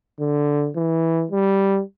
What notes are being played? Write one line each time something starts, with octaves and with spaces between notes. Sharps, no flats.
D3
E3
G3